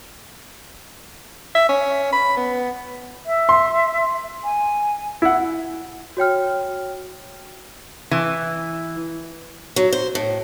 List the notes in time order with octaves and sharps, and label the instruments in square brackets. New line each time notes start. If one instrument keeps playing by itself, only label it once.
[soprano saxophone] E5
C#4
B5
B3
[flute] E5
[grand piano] C6
[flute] G#5
[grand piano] E4 F#5
[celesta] F#4 C#5 G5 F6
[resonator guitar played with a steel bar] E3
[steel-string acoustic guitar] F#3
C5
A2